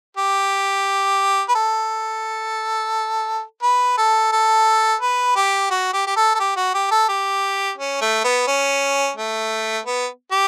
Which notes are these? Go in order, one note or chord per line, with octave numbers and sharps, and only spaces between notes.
G4
B4
A4
B4
A4
A4
B4
G4
F#4
G4
G4
A4
A4
G4
F#4
G4
A4
G4
C#4
A3
B3
C#4
A3
B3
G4